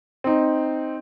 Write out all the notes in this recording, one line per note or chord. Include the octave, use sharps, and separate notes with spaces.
C4 D#4